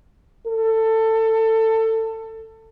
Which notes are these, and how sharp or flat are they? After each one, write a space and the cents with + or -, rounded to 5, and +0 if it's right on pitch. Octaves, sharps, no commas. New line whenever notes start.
A4 +20